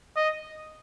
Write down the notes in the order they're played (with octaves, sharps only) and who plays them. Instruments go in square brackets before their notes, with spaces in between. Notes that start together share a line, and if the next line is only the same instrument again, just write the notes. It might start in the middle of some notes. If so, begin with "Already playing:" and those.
[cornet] D#5